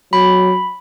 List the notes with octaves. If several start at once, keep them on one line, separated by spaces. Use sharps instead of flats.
F#3 B5